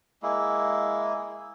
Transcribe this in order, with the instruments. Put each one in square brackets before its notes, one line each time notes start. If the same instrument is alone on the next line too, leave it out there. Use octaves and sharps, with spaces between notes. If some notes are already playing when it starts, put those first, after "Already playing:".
[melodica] G#3 A#3 E4